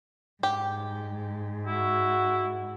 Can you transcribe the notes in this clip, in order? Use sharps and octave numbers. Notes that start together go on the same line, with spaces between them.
G#2 G4
E4 F#4